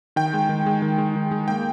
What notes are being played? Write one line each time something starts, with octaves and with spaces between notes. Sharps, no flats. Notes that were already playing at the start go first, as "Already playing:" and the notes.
D#3 G5
G#3
D#3
G#3
D#3
G#3
D#3
G#3
A#3 G5